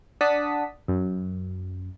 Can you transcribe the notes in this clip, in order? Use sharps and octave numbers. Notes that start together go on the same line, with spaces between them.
D4 D5 F#5 A5 D#6 B6
F#2